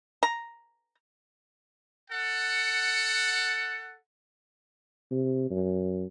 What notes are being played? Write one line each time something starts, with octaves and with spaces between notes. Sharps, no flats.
A#5
A4 F#5
C3
F#2